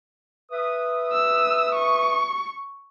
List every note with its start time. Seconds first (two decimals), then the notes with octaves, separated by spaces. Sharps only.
0.51 B4 E5 D#6
1.12 E6
1.75 C#6